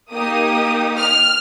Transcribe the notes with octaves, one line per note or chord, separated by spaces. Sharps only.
A#3 D#4 G4 D#6
F6